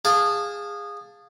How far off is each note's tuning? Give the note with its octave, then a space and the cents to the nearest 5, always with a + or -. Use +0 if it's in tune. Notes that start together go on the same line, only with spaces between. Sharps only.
G#4 -20 F5 +15 A5 +0